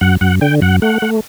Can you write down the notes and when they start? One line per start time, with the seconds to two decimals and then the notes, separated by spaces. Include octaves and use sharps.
0.01 F#2 F#5
0.21 F#2 F#5
0.41 D3 G5
0.62 F#2 F#5
0.82 A3 F#5
1.02 A3